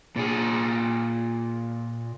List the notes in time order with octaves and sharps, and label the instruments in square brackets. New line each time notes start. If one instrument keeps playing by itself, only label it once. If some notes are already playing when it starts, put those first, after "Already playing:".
[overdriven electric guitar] A#2 G#4